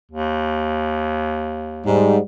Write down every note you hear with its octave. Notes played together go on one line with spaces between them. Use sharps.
D#2
G#2 G3